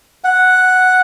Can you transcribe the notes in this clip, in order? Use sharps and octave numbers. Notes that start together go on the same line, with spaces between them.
F#5